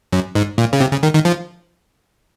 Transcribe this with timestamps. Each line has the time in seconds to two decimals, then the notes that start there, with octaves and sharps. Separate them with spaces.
0.13 F#2
0.35 G#2
0.58 A#2
0.73 C#3
0.80 C3
0.91 C#3
1.03 D#3
1.14 D#3
1.25 F3